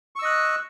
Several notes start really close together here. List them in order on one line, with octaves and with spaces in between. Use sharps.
C#6 E6 D#5 F#6